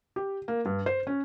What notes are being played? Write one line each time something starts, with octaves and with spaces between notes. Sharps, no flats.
G4
A#3
G2
C5
C#4